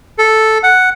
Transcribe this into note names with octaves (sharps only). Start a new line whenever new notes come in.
A4
F#5